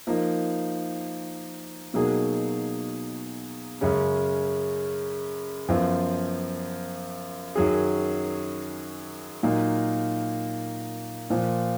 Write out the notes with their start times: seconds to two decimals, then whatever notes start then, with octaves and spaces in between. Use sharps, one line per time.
0.07 F3 A#3 D#4
1.94 B2 F#3 A#3 D#4 G#4
3.81 F#2 C#3 G#3 C#4
5.68 F#2 F3 B3 F4
7.56 F#2 D#3 F#3 C#4 G#4
9.43 A#2 F#3 A#3 D#4
11.30 A#2 F3 A#3